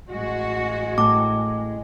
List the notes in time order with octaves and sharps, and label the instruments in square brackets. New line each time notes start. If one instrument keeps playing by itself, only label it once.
[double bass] A1 G#3 [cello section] F#4
[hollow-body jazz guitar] A2 [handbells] D6